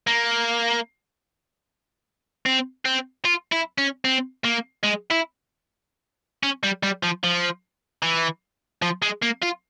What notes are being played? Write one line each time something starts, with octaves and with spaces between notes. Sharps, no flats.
A#3
C4
C4
F4
E4
C#4
C4
A#3
G#3
E4
C#4
G3
G3
F3
F3
E3
F3
G#3
A#3
F4